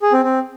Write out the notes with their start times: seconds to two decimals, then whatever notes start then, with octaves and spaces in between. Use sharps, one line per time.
0.02 G#4
0.13 C4
0.23 C4